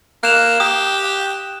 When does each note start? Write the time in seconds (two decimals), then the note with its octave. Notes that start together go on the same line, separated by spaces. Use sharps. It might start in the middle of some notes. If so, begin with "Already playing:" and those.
0.23 A#3 F#6 E7 F7
0.60 G4 D#6